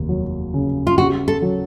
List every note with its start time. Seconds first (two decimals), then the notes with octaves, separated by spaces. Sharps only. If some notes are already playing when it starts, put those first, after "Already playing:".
Already playing: F1 D#2
0.09 F#3
0.54 C#3
0.87 F4
0.98 C#3 F#4
1.28 A4
1.42 F#3